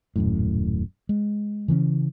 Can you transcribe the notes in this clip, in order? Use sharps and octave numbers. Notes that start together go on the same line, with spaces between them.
D#1 F#2 A2
G#3
C#3 E3 A3 C#4